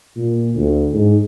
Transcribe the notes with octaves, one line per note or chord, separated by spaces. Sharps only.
A#2
D2
G#2